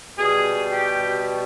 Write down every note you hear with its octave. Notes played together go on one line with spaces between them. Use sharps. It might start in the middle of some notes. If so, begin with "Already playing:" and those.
B2 G3 G#4
G4